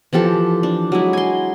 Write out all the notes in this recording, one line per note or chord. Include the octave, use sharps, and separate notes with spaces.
E3 F3 G4 A4
D4
F#3 G#3 E4
G#5 C6